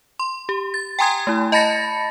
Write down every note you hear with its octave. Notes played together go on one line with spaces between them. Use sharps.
C6
G4
A6
G5 G#5 A#5 C6 D#6 G#6
A3 E4
D#5 A5 B5 A6 A#6 C#7